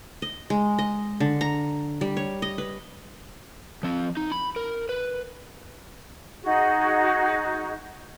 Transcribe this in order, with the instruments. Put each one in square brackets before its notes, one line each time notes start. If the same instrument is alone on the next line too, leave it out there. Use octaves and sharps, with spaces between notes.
[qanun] D#5
G#3
D#5
D3
A#5
G3
C#5
D#5
B4
[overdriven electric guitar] F3 C4
D#4
B5
A#4
B4
[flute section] D#4 F#4 G#4